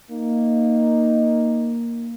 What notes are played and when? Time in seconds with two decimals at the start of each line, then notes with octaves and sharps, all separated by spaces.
0.11 A#3 D#4